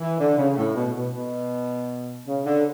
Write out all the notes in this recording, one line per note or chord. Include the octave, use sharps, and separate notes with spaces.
E3
D3
C#3
A2
B2
B2
B2
C#3
D3